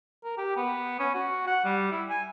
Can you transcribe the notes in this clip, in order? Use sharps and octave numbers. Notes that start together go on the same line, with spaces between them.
A#4
G4
B3
C#4
F#4
F#5
G3
E4
G#5